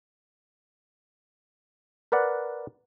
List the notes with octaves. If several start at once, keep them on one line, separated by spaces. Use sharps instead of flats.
A#4 B4 D5 F#5